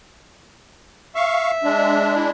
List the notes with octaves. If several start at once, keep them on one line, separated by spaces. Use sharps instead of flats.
E5 F5 C#6
G#3 D4
E4